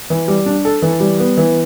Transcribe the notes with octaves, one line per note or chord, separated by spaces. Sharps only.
E3
G3
D4
A4
E3
G3
B3
E3